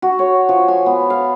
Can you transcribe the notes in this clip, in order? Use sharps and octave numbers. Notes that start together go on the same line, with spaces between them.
F#4
C#5
F3
G#5
B3
F5